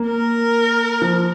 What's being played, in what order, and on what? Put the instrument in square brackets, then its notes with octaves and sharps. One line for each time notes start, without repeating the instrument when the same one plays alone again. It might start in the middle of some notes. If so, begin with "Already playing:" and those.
Already playing: [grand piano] A#3
[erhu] A#4
[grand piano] F3